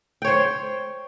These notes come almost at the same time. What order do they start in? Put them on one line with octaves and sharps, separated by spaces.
G5 C#5 C5